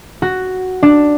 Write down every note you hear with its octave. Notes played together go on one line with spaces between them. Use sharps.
F#4
D4